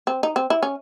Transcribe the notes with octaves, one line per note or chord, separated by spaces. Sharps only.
C4
D#4
C4
E4
C#4